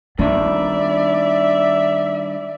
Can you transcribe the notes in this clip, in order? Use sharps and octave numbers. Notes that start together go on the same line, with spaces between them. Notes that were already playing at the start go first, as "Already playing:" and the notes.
G2 D#3 B3 D4 D5 E5